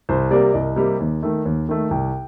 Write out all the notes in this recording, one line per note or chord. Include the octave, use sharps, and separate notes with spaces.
C2 C5
C3 G3 A#3 D5
C2 D#5
C3 G3 A#3
D#2
D#3 A3
D#2
D#3 A3
C2 G5